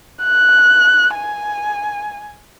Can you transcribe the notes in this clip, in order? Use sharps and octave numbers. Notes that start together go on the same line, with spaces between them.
F#6
G#5